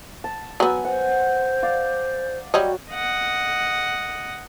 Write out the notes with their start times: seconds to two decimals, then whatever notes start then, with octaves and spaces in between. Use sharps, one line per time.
0.24 A5
0.60 F#3 B3 G#5
0.85 C5 F#5
1.62 D5 F5
2.54 F#3 G3 F#4 C#5 D#5
2.91 D#5 F#5